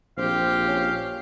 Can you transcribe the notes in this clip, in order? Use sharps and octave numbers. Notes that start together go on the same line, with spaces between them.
A#1 C4 G4 F5
C#4